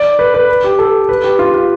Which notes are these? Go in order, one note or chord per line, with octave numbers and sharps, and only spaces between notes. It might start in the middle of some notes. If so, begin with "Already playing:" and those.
Already playing: D5
B4
B4
G4
A4
B4
G4
F4
F4